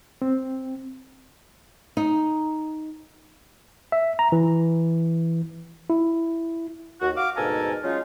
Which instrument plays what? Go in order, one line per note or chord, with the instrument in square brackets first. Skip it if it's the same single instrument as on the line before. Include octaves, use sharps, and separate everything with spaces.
[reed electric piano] C4
[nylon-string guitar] D#4
[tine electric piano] E5
A#5
E3
E4
[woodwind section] D#2 F#4
F#4 F5 D6
D2 G#2 B2 A4 A#4 G#5
F#3 G#3 C#4 D#4 F4